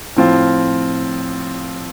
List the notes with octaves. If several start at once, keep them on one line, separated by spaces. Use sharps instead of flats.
A2 F3 C4 F4